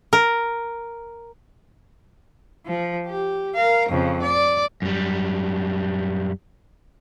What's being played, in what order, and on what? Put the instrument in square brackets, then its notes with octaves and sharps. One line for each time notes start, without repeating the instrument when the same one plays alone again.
[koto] A#4
[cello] F3
G4
A#4 F5
F2 C#3
D5
[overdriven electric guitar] F#2 G3